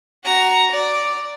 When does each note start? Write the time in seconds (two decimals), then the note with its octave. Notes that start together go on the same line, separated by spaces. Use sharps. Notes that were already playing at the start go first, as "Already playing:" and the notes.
0.24 F#4 A#5
0.71 D5